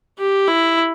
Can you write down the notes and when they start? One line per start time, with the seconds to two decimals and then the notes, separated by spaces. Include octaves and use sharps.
0.18 G4
0.48 E4